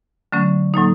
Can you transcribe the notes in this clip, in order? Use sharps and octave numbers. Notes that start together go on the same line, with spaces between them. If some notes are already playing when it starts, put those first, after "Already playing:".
D3 F#3 A3 C#4
A2 F#3 A#3 D#4